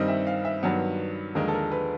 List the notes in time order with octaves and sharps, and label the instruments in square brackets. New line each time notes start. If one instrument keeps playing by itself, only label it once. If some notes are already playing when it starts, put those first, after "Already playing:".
Already playing: [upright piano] G2 D#3 G3 C4 D#5
E5
F5
E5
G2 D#3 F#3 B3 B4
D#2 D3 F3 G#3 A#4
A4
A#4
B4